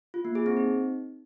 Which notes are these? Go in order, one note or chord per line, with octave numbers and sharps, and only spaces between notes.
F4
A#3
G#4
C4
D#4